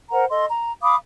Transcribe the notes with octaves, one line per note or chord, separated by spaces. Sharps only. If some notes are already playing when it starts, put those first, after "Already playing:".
A#4 C5 F#5 A#5
A4 D#5 C6
A#5
F5 B5 D6 D#6